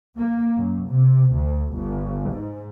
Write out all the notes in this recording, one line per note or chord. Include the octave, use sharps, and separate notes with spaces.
A#3
F#2
C3
D2
G1
G#2